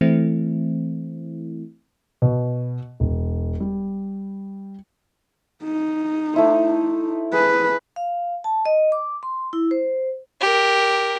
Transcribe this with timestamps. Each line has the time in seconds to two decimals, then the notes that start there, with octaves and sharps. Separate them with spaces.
0.01 E3 A3 C4 E4
2.22 B2
3.00 E1
3.60 G3
5.63 D#4
6.34 A3 E4 C5
7.33 G#4 B4
7.96 F5
8.44 A5
8.65 D#5
8.92 D6
9.23 C6
9.53 E4
9.71 C5
10.41 G4 A#4